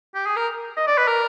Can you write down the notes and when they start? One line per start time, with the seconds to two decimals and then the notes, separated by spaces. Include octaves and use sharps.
0.15 G4
0.26 G#4
0.36 A#4
0.77 D#5
0.87 D5
0.98 B4
1.08 A#4